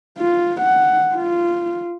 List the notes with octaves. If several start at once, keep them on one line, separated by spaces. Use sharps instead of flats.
F4
F#5
F4